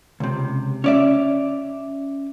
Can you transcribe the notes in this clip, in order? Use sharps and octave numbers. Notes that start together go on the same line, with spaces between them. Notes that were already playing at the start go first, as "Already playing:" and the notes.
C#2 C3
C#4 D5 E5